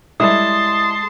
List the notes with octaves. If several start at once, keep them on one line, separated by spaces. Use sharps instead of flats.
G3 G#3 E4 A5 C6 D#6